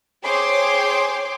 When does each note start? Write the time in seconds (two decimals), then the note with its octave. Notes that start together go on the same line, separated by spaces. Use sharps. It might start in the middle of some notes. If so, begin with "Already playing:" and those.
0.25 G#4 C5 C#5 G5 C6 D6